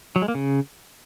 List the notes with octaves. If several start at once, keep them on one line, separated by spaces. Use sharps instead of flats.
F#3
G#3
A#3
C#3